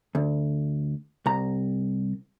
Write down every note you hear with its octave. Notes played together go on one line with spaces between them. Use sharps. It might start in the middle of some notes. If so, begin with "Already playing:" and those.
D2
C2 A#5